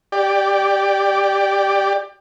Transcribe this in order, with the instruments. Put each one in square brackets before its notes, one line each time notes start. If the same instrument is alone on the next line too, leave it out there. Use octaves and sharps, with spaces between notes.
[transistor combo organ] G4 D5